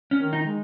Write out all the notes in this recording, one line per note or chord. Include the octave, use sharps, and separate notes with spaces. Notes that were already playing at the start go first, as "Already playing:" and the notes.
C#4
D#3
D#4
G#3